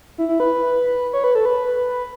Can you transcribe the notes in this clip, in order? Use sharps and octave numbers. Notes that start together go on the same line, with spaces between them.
E4
E4
B4
C#5
B4
A4
B4